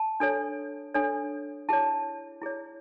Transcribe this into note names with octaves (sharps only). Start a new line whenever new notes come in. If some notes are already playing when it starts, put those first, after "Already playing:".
Already playing: A5
D4 A4 C#5
D4 A4 C#5
E4 G#4 C#5 A5
E4 G#4 C#5